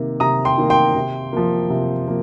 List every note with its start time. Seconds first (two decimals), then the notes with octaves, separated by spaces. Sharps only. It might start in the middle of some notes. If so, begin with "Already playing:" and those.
Already playing: C3 D#3 A#3
0.20 C3 A#5 D#6
0.45 G5 C6
0.58 D#3 A#3
0.70 G5 C6
0.95 C3
1.33 F3 A#3
1.70 C3
2.07 F3 A#3